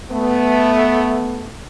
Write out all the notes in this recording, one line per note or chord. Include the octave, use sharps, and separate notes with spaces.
A3 B3